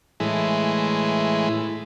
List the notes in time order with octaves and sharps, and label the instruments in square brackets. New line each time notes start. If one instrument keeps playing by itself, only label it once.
[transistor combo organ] A2 E3 G#3